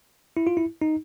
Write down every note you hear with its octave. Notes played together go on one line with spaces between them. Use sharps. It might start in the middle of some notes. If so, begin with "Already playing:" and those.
E4
F4
E4
D#4